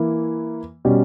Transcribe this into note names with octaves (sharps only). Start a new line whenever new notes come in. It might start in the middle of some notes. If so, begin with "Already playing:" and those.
Already playing: E3 A#3 E4
B2 G3 C#4